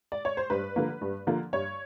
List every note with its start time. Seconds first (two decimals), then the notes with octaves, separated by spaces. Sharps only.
0.12 D5
0.25 C#5
0.37 C5
0.50 G2 B4
0.76 D3 F3 A#3
1.01 G2
1.27 D3 F3 A#3
1.53 G2 C#5